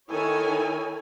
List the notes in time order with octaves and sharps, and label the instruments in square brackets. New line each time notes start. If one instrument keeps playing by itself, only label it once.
[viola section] D#3 E4 A4 C#5 G#5